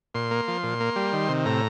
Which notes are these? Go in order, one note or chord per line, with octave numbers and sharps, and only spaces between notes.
A#2 C6
A#3
F3
A#2
A#3
G3
D#3
C3
A2 A#5